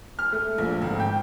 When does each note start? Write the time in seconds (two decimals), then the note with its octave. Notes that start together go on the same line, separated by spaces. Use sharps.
0.19 F6
0.33 A3
0.58 A#1
0.82 G#1
1.00 G5